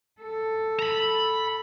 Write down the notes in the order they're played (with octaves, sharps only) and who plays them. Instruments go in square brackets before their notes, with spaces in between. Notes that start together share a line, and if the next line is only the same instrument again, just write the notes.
[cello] A4
[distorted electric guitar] A#5 B5